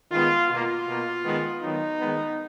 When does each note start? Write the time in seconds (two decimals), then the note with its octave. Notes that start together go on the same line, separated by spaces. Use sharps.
0.11 D#3 G#3 B3 F4
0.49 B2 A#3 F4
0.87 B2 A#3
1.24 D#3 G#3 B3
1.62 D#3 F#3 B3 D#4
2.00 D#3 G#3 B3